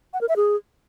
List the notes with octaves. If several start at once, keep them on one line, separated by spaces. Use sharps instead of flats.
F#5
A#4
E5
G#4